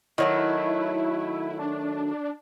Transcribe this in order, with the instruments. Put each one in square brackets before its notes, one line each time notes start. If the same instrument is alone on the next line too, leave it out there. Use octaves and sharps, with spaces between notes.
[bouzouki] D#3 F#3 A3 [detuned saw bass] E4
[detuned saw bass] D4